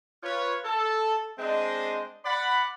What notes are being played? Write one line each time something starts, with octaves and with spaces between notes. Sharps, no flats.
F4 B4 C#5
A4
G#3 C4 D4 C5 D#5
D5 F#5 B5